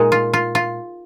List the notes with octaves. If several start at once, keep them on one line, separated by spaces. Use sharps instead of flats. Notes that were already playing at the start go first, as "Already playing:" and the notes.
Already playing: A#2 G#3 D#4
F4
F4
F4